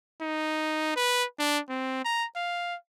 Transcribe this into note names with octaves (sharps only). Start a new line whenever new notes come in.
D#4
B4
D4
C4
A#5
F5